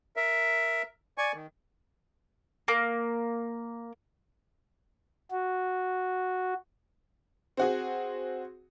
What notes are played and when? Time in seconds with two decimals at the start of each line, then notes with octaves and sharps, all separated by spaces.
0.17 A#4 E5
1.18 D5 G#5 C#6
1.34 D#3
2.68 A#3
5.31 F#4
7.57 C4 F#4 G#4